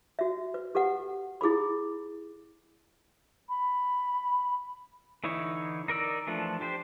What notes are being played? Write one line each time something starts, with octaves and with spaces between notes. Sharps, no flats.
F#4 E5
B4
G4 A4 B4 F#5
E4 G#4 A4 B5
B5
D3 E3 D#4 E4 C#5
D#4 A#4 D5 E6
E3 F3 A3 D4
D4 G4 C5